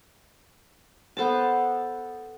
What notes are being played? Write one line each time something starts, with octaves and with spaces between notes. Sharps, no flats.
B3 A4 C5 A5